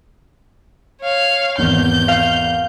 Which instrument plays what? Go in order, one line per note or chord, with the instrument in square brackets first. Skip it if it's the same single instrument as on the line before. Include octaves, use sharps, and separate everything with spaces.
[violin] C#5 F5
[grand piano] G#1 E2 [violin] G6
[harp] F5